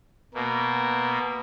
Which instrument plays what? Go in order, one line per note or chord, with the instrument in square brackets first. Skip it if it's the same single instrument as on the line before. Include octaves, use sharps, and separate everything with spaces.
[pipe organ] B2 A#3